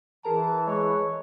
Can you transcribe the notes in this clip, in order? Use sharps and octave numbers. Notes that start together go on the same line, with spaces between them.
E3 G#4 A#4 A5 A#5
G#3 C#5